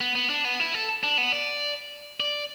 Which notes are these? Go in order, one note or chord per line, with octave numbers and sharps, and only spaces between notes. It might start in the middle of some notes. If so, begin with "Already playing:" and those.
B3
B3
D4
B3
E4
A4
D4
B3
D5
D5